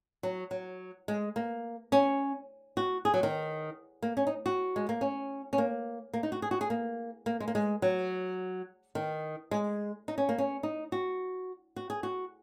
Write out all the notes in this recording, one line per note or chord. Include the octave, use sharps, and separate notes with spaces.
F#3
F#3
G#3
A#3
C#4
F#4
G#4
F#3
D#3
A#3
C#4
D#4
F#4
G#3
A#3
C#4
C#4
A#3
A#3
D#4
F#4
G#4
F#4
G#4
A#3
A#3
G#3
A#3
G#3
F#3
D#3
G#3
D#4
C#4
A#3
C#4
D#4
F#4
F#4
G#4
F#4